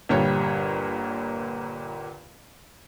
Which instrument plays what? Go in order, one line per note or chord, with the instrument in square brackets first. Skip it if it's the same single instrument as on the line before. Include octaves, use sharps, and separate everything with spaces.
[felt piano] G1 A#2 G3 C#5